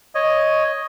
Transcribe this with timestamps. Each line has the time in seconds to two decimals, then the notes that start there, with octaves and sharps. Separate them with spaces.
0.15 C#5 D#5